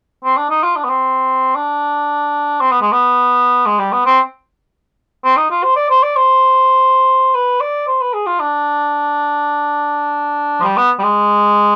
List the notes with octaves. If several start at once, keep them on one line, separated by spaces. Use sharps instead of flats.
C4
D4
D#4
F4
D4
B3
C4
D4
C4
B3
G#3
B3
G#3
G3
B3
C4
C4
D#4
F4
C5
D5
C5
D5
C5
B4
D5
C5
B4
G#4
F4
D4
F3
G3
B3
G3
G#3